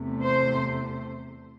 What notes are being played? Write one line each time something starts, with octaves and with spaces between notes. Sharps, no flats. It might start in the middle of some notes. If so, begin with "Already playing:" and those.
Already playing: E2 C3 A3
C5